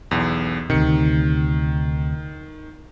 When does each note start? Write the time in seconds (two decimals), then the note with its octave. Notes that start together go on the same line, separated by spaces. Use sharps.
0.11 B1 E2
0.70 D2 C3 D#3 C#7